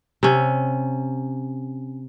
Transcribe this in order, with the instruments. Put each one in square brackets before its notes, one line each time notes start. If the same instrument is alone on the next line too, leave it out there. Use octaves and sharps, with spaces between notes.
[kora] C3 C#4